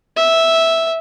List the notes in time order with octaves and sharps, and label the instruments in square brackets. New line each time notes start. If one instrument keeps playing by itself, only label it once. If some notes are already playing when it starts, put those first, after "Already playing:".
[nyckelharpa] E5